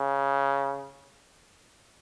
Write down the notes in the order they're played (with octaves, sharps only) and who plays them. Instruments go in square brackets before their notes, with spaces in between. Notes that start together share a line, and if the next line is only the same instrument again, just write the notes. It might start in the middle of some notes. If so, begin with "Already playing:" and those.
Already playing: [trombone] C#3